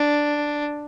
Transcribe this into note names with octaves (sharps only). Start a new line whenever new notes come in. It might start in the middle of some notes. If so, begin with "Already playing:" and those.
Already playing: D4